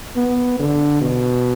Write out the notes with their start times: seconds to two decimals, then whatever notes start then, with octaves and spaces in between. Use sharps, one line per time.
0.16 B3
0.59 D3
1.01 B2